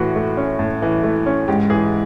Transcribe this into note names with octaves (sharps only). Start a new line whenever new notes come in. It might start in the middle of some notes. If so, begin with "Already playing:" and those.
Already playing: A2 E3 F#4
A3
C#4
A2
E3
A3
C#4
G#2 G4
E3 G#4